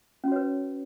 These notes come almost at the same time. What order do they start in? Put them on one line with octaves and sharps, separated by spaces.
C#4 F#4 C#5 B4